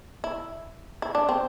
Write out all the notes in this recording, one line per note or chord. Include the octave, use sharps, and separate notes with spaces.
E4
E4
D4
C4